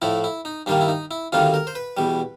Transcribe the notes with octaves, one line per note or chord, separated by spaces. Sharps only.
A2 F3 A3 E4
E4
D#4
G2 D#3 G3 A#3 D4
E4
D#4
E4
D2 C3 D#3 G3 A#3 F4
A#4
C5
B4
E2 B2 G3